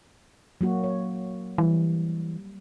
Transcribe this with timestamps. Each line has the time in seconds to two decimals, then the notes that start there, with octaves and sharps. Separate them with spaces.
0.61 F#3 A#3 F#4
0.84 C#5
1.58 E3 G3